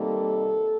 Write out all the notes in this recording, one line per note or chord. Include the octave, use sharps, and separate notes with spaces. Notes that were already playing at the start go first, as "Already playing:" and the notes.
Already playing: C3 D#3 G3 A#3 A4